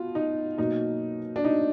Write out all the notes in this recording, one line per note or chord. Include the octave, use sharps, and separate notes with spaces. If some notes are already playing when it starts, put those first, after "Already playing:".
Already playing: B2 F4
D#4
B2 F#3 A#3 D#4
D4
D#4